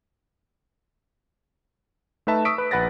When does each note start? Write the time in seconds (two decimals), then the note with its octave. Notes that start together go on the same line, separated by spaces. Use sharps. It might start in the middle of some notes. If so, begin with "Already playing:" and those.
2.27 A3 D#4 B4 E5 A5
2.45 C#6 D#6 E6 B6 D7
2.58 B4
2.71 A#1 B4 F#5 A6 A#6